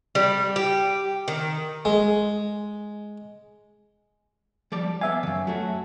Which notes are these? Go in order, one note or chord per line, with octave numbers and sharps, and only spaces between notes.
G3
G4
D#3
G#3
F3 G3 D5
B3 E5 F5 G#5
F#2 D#3
F#3 A3 F#4